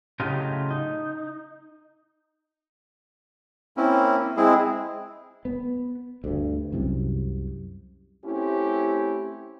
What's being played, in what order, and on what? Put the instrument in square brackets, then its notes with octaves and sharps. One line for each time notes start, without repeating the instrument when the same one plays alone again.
[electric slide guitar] A2 C#3 F#3 F4 G4 D#5
D#4
[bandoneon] A#3 C4 C#4 E4
G#3 C4 E4 G#4
[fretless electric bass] B3
D2 G2
C2 F#2 C3
[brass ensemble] A3 C4 C#4 E4 G4